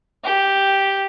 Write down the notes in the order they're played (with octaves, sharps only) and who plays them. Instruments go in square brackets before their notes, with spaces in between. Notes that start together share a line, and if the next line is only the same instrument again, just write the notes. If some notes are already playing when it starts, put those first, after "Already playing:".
[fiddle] G4